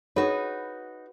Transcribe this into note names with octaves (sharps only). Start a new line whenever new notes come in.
D#4 F#4 G#4 B4 C#5